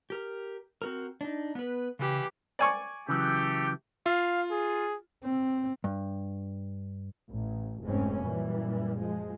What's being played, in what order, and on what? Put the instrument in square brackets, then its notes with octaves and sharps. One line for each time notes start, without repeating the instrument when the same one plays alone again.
[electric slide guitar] G4 A#4
C4 F#4 A#4
D4 D#4
B3 B4
[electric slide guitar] C#3 [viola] E3 G4
[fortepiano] D5 G#5 C#6
[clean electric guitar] C#3 E3 F#3 [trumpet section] A3 G4
[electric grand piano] F4 [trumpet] F5
[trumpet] G#4
[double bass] C4
[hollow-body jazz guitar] G2
[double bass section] A1
F1 G#2 G#3 C4 C#4
F#2 A#2 E3 G3
F3 G#3